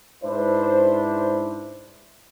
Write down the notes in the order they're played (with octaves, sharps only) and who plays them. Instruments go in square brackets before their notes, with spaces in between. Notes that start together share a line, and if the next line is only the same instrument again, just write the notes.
[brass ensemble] G#2 D4 E4 B4 C5